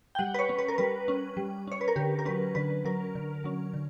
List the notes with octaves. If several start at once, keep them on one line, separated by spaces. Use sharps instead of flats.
G5
G3 F#5
B4
C#5
C#4
B4
A#4
G3 B4
C#4
G3
C#4 C#5
B4
A#4
D3 G4
A#4
F#3 C#4 B4
D3 B4
F#3 C#4 A#4
D3
F#3 C#4
D3